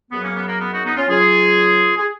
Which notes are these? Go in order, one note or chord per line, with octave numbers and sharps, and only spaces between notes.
F#2 C#3 F#3 B3
A#3 C#4
B3
A#3
B3
D#4 F#4
B3 D#4
C#4 F4
C#2 C#3 F#3 F4 G#4
G#4